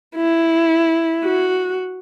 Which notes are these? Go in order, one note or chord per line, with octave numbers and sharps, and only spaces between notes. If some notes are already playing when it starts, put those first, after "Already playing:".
E4
F#4